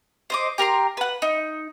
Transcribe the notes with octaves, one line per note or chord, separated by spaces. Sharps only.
C5 D#5 D6
G4 A#4 A#5 C6
B4 F#5
D#4